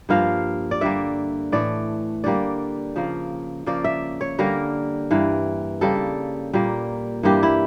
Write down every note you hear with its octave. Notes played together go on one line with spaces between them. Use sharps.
G2 F3 A#3 F5
D5
D3 G3 A#3 E5
A2 E3 A3 D5
D3 G3 A#3 D5
C#3 F3 A#3
C#3 F3 A#3 D5
E5
C#5
D3 G3 A#3 A#4
G2 E3 A#3
C#3 G3 A#3 A4
A#2 G3 A#3
G2 E3 G3 A#3 G4
E4